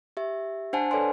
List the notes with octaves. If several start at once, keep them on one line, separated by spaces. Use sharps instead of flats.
G4 E5
D4 C5 F#5 G#5 A5
A4 B4 C#5 D5 G#5 C6